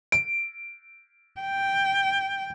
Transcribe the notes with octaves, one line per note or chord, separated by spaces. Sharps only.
D7
G5